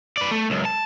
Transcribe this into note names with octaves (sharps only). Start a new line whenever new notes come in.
B4 D5
A3
C#2 F#2
A5